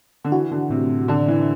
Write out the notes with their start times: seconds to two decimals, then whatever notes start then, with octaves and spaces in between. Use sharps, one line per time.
0.24 D3
0.32 E3 F#4
0.51 D3
0.70 A2 C3
1.08 D3 D4
1.28 E3